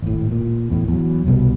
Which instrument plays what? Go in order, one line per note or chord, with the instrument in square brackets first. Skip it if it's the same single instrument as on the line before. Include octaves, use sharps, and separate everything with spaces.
[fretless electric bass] G#1 A2
A#2
E2 A2
E2 F#3
C2 B2 G3